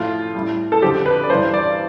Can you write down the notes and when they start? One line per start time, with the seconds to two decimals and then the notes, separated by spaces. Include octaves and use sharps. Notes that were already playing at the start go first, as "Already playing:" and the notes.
Already playing: A2 F3 A3 F4
0.35 A2 G3
0.72 A4
0.82 F2 D3 F3 G4
1.06 B4
1.23 D5
1.30 G2 E3 G3 C5
1.54 D5